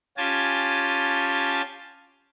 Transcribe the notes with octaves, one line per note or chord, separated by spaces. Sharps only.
C#4 F4 G4 G#5 A5